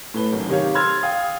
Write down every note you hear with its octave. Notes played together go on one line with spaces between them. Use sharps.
A2 B4 G7
G#1 F#2
C3 D#3 G4 C#5 F5
C6 E6 F6 G#6 A6
F5 G5 D#6